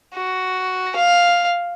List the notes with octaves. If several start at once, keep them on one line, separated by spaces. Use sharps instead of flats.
F#4
F5